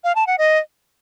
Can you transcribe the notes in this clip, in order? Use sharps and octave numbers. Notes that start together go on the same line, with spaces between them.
F5
A5
F#5
D#5